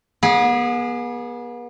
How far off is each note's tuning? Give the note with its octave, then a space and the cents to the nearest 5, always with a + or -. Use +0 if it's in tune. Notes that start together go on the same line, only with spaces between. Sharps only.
B3 -40 G#4 -5